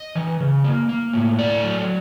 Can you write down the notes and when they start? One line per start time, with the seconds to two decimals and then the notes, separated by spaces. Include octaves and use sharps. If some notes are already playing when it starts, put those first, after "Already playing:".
Already playing: D#5
0.15 E3
0.40 C#3
0.64 A#3
0.89 A#3
1.13 A2
1.39 A3 D5
1.64 F#3